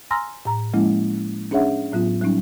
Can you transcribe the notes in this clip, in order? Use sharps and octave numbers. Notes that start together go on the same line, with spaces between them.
G#5 A#5 C6 E6 F6 A#6
A2 A#5
F3 G#3 A#3 C#4 E4
C#4 D4 G#4 C#5 E5 F#5
A2 F#3 B3 F4
F#3 G3 C#4 D#4